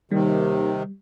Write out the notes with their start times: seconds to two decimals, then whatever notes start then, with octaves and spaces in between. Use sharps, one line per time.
0.11 D#2 C3 D#3 G3